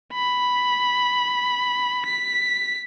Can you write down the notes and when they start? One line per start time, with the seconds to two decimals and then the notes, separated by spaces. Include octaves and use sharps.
0.13 B5
2.06 B6